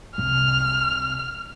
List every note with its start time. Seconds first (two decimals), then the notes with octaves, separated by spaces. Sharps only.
0.18 C2 C3 F6